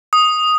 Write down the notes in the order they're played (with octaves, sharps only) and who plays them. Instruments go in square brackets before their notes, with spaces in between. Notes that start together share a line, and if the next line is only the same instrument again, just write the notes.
[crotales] D#6